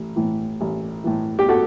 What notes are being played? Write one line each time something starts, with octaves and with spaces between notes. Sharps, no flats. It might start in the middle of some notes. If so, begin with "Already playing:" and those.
Already playing: A1
A2 E3
A1
A2 E3
G4
F#4 A4